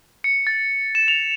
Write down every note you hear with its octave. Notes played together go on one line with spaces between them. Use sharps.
C#7
A6
E7
F7